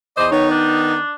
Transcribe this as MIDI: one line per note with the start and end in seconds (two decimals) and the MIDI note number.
0.17 0.30 40
0.17 0.30 72
0.17 0.26 74
0.17 0.30 75
0.31 0.98 51
0.31 0.98 59
0.31 0.98 63
0.31 0.48 73
0.51 1.13 62